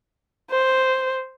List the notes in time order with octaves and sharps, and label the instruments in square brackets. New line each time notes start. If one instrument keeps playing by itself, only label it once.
[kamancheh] C5